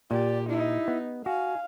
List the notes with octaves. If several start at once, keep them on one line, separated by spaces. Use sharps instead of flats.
A#2 G4 D5
D#4 E4
B3
F#4 F5 G#5